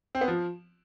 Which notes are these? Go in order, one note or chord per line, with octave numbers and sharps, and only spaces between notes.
C4
B3
F3